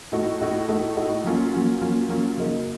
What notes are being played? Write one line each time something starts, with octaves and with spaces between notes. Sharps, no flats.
A2 A3 D#4 F#4
A2 A3 D#4 F#4
A2 A3 D#4 F#4
A2 A3 D#4 F#4
F#3 A#3 C#4 F4
F#3 A#3 C#4 F4
F#3 A#3 C#4 F4
F#3 A#3 C#4 F4
C#3 F#3 A#3 D#4 A#4